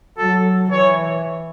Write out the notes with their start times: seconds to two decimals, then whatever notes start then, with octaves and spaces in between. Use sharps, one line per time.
0.18 F#3 A4
0.71 E3 C#5